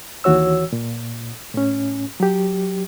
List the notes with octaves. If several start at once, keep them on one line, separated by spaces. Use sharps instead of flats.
D#2 E3 F#4 C#5 E6
A#2
A2 C#4
F#3 G4